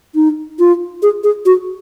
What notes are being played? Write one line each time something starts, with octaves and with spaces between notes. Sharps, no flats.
D#4
F4
G#4
G#4
F#4